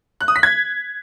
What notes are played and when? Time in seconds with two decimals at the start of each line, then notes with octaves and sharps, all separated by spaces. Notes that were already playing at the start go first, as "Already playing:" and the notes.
0.21 F#6
0.28 D#6
0.36 B6
0.43 G#6